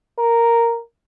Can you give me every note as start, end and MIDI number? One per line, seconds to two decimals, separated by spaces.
0.18 0.78 70